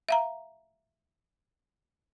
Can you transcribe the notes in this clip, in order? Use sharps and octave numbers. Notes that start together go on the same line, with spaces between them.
E5 F5 A#5